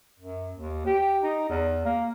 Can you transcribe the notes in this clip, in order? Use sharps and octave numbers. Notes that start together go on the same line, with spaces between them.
F#2
D#2
G4
D#4
E2
A#3